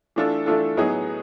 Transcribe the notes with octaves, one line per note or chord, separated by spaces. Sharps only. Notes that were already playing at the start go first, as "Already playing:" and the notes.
E3 A3 D4 F4 A4
E3 A3 D4 F4 A4
A2 F#3 B3 D#4 G#4